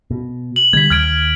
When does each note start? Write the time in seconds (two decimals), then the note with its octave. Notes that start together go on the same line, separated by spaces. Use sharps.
0.11 B2
0.56 F#7
0.73 D3 G3 G#6 B6
0.90 D#2 F6 G#6 D7